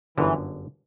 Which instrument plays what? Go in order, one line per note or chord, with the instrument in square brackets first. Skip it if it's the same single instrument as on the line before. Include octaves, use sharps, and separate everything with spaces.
[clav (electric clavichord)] G1 F#2 D3 [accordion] E3